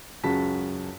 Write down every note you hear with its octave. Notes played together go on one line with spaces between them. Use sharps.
C#2 F#2 F#4 G#4 A5 B6